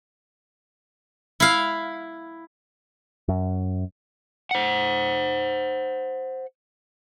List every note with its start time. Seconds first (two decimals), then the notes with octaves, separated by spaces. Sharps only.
1.40 E4 F5
3.28 F#2
4.51 C5 F#5